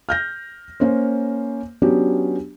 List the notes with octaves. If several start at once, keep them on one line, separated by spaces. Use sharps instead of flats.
F6 G6 A#6
A#3 C#4 C5
F#3 B3 C#4 D4 F#4 G4